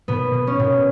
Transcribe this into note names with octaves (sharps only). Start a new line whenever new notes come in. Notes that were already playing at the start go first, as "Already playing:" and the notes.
B2 B3
B2
C#4
B2